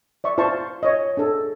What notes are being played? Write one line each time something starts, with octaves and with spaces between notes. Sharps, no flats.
D5 E5 C#6
F4 C5 E5 A5 C#6
C#5 D#5
D4 G#4 A4